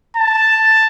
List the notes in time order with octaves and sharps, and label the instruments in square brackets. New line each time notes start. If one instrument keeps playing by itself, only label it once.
[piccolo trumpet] A5